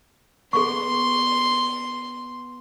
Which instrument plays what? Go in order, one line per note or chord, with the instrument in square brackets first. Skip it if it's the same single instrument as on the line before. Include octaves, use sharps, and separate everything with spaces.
[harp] B3 [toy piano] G#4 C#6 [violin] C6